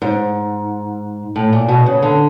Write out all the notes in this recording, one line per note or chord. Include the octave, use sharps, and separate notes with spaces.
G#2
A2
A#2
B2
C#3
D3